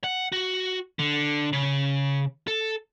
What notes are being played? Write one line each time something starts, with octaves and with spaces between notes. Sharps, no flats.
F#5
F#4
D3
C#3
A4